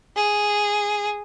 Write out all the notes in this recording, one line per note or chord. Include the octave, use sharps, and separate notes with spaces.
G#4